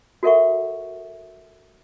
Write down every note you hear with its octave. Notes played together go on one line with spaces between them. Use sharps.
F#4 A4 A#4 E5 F#5 C#6